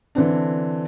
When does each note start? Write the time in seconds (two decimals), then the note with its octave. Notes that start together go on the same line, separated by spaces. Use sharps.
0.15 D3 E3 C4 D4